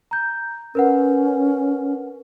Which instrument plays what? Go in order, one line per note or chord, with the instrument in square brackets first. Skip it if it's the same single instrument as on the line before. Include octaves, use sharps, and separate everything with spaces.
[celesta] A#5 G6
[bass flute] C#4 [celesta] A#4 B4 F#5